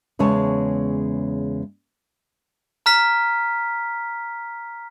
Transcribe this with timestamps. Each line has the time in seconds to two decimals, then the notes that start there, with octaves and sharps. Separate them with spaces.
0.19 E2 C#3 G#3 C#5 A5
2.86 A#5 F6 B6